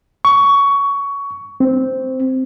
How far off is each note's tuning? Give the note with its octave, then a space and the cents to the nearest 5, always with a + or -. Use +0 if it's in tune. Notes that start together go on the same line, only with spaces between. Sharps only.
C#6 +15
C4 -5